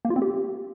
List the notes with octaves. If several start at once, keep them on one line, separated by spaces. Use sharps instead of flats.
A#3
F4
C4
G4